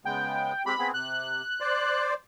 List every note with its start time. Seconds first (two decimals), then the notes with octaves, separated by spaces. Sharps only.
0.05 C#3 G#3 B3 G5
0.66 G#3 C4 G4 B5
0.79 B3 C4 G#4
0.94 C3 F#6
1.60 C5 D5